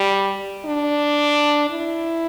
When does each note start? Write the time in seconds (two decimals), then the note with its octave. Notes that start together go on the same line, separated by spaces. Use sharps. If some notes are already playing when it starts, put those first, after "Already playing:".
Already playing: G3
0.65 D4
1.70 E4